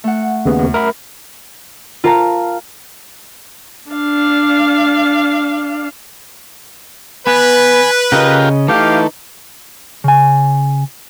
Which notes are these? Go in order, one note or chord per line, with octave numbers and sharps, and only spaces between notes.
A3 F#5
D#2 C#3 B3
F#2
A#4 E5 B5
F4 A#4 F5 A5 A#5
D4 F5
B3 B4 G#5 B5
C#3 F4 G4 A#4 D#5
E3 A3 D#4 G4 F5
C#3 G#5